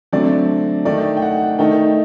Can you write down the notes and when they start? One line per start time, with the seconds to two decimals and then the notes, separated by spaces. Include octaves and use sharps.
0.12 D3 F#3 A3 C4 D5
0.85 D#3 A3 D#4 D5
1.17 G5
1.22 F#5
1.59 D#3 A3 D#4 G5